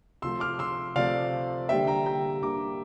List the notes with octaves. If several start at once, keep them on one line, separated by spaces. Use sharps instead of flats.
C3 F3 A3 C6 E6
D6 F6
C6 E6
C3 F3 A3 D5 F5
D3 G3 A#3 E5 G5
G5 A#5
G5 A#5
D3 G3 A#3 A#5 D6